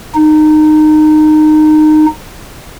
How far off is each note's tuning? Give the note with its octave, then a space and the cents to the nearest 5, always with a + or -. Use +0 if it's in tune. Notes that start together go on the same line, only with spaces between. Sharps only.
D#4 -20